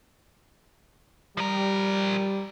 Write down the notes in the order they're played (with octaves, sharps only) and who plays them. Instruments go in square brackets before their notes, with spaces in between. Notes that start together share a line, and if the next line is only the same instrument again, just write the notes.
[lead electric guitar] F3 A#4 [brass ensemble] G3